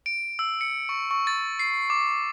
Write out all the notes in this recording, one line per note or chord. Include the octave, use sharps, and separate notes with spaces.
D7
E6
C#7
C#6
C#6
A6
C7
D6